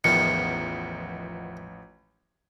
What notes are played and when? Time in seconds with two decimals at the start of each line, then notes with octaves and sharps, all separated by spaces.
0.04 A1 E2 B2 D#3 F3 C#7